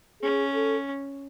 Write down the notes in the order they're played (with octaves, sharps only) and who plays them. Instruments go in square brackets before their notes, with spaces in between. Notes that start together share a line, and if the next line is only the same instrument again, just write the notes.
[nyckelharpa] C#4 [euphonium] G#4
[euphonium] A4